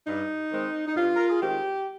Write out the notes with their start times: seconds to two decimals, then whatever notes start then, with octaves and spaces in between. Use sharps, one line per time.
0.07 G2 D#4
0.51 D#3 G#3 C4
0.86 D#4
0.96 G2 F4
1.15 A#4
1.29 G#4
1.41 D#3 G#3 C4 G4